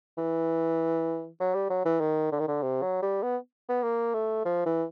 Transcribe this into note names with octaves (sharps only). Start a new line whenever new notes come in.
E3
F#3
G3
F#3
E3
D#3
D3
D#3
D3
C3
F#3
G3
B3
B3
A#3
A3
F3
E3